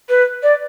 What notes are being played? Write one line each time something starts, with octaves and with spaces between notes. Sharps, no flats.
B4
D5